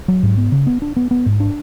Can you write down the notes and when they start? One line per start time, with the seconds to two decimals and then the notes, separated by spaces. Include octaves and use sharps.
0.08 F#3
0.23 G#2
0.37 B3
0.52 C#3
0.67 B3
0.82 D4
0.96 B3
1.11 B3
1.26 G#2
1.40 D4